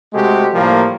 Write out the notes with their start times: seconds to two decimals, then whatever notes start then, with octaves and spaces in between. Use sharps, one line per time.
0.13 C3 G#3 A3 F#4 G4
0.54 A2 F3 G3 A#3